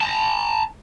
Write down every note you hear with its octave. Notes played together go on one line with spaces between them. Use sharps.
A5 A#5